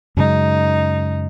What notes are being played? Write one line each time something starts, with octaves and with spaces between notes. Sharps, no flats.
F#2 C#3 G#3 D#4